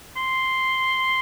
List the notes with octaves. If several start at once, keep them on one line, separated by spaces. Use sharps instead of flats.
C6